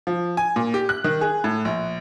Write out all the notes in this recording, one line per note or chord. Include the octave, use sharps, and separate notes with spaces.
F3
G#5
A#2
G4
F#6
D#3
G#4
A2
A#1